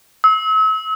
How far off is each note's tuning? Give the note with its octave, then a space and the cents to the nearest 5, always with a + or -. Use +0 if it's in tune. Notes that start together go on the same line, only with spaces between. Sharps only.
E6 -40